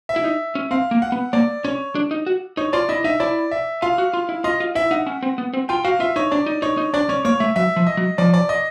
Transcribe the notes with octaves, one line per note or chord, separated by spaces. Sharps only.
E5
E4
D#4
C#4
C4 F5
A#3
F#5
B3
A#3 D5
C#4 C#5
D4
D#4
F#4
D#4 C#5
F4 D5
E4 D#5
D#4 E5
E4 D5
E5
F4 F5
F#4
F4
E4
F4 D#5
F4
E4 E5
D#4 F#5
C#4
C4
B3
C4
F4 G5
F#4 F5
F4 E5
D#4 C#5
D4 D5
D#4
D#4 C#5
D#4
D4 D5
C#4 C#5
A#3 C#5
A3 E5
F#3 E5
F3
D#5
F#3
F3 D5
D5
D#5